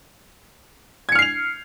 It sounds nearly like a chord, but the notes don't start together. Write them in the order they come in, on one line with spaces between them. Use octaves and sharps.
G#6 C#7 F6 C7 F7